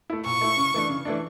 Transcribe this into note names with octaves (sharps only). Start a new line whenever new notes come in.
A3 E4
A#2 C#6
A3 E4
C#3
E3 A3 D4
C#3
E3 A3 D4